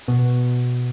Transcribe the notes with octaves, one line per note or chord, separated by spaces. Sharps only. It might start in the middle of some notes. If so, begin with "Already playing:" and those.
B2